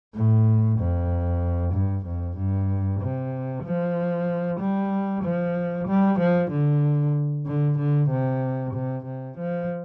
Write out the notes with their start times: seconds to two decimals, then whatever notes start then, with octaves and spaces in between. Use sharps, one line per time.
0.15 A2
0.79 F2
1.73 G2
2.06 F2
2.37 G2
3.01 C3
3.64 F3
4.60 G3
5.23 F3
5.88 G3
6.19 F3
6.51 D3
7.47 D3
7.78 D3
8.10 C3
8.74 C3
9.06 C3
9.38 F3